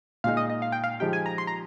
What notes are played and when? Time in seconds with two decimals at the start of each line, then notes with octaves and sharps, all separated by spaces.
0.24 A#2 G#3 D#4 F5
0.37 D#5
0.50 D#5
0.62 F5
0.72 G5
0.84 F5
1.00 F3 G#3 D#4 G4 G5
1.13 G#5
1.26 A#5
1.38 C6
1.47 A#5